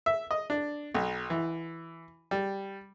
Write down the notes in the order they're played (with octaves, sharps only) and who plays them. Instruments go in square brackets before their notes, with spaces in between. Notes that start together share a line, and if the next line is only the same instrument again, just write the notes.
[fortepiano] E5
D#5
D4
B1
E3
G3